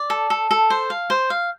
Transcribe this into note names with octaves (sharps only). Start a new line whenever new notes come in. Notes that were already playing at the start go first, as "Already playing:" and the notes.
Already playing: D5
A4
A4
A4
C5
F5
C5
F5